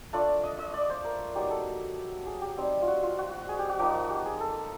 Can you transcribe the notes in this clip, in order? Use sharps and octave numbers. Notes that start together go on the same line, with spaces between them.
A3 D4 F4 D5
D#5
D#5
D5
C5
A#4
F#3 B3 D#4 G4
A4
G#4
G4
G3 C4 D#4
F4
F#4
F4
F#4
G#4
G4
F#4
F3 A#3 D#4 F#4
G4
G#4
A4